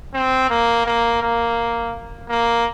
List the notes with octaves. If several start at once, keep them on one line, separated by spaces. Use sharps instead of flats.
C4
A#3
A#3
A#3
A#3